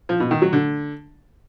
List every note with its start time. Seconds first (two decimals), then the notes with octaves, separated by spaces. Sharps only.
0.09 F3
0.20 B2
0.31 D#3
0.42 F#3
0.53 D3